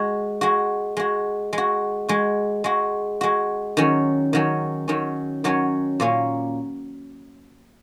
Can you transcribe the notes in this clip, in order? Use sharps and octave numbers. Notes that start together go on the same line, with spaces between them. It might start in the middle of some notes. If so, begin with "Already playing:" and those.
Already playing: G#3 F#4
G#3 F#4
G#3 F#4
G#3
F#4
G#3 F#4
G#3 F#4
G#3 F#4
D#3 F#3 C#4
D#3 F#3 C#4
D#3 F#3 C#4
D#3 F#3 C#4
A#2 A#3 C#4